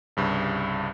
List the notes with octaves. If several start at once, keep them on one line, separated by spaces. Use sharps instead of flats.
C2 G2 C#3